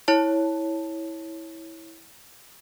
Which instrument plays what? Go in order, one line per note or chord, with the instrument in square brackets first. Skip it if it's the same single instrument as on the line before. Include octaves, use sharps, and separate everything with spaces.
[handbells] E4 C#5 A5